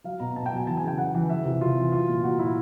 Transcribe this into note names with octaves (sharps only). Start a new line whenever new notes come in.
F#3 F5
B2 A#5
B2 A5
G5
F#3 G#5
E3 A5
G#5
C#3 G5
C#3 F#5
E3
E3 E5
C3
C3 F4
E3
F#3 F4
A#2
A#2 F#4
F#3 E4